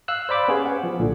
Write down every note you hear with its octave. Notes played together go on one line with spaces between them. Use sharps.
F5 E6 F#6
C5 D5 B5 D6
B3 C#4 G4 G#4 C#5 F5
F#5
F3
B1 A#2 D3